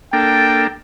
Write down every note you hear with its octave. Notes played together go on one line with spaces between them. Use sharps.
A#3 D4 A4 G5